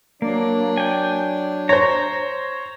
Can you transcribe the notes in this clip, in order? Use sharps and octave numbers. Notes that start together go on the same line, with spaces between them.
F#3 A#3 D4 D5
G5 G#5
C5 C#5 A#5